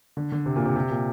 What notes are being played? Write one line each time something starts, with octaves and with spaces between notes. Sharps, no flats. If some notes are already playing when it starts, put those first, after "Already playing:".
D3
D3
C3
A#2
C3
C3
A#2